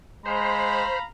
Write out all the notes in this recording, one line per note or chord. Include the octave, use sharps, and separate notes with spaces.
G#3 C5 F5 A#5 B5